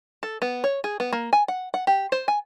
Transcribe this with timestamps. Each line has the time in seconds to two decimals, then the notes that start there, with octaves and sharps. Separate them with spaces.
0.23 A4
0.42 B3
0.64 C#5
0.84 G#4
1.00 B3
1.12 A#3
1.33 G#5
1.48 F#5
1.74 F#5
1.87 G4
2.12 C5
2.28 G#5